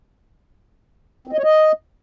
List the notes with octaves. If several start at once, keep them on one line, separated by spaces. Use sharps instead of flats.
C4
D#5
C#5
D#5